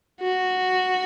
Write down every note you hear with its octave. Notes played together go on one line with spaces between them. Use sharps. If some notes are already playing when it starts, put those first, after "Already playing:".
F#4